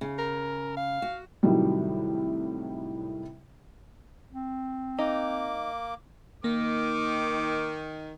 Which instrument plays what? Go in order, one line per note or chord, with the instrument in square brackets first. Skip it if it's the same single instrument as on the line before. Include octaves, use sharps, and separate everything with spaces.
[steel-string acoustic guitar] C#3
[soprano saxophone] A#4
F5
[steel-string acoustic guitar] F#4
[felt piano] A2 C3 D#3 F#3 G3
[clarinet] C4
[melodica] A#3 D6 [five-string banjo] D#4
[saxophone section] D#3 [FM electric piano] A#3 [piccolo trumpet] D6